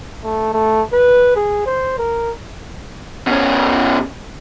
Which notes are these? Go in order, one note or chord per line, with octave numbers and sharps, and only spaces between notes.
A3
A3
B4
G#4
C5
A#4
B2 C#4